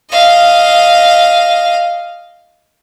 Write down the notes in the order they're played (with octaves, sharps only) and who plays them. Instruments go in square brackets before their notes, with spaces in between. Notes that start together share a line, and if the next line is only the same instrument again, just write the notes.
[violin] D#5 F5